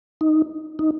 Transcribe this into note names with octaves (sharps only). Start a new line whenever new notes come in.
D#4
D#4